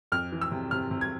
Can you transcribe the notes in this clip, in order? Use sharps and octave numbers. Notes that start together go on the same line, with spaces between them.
F2 F6
E3
E6
C3
C3 F6
C3
G#6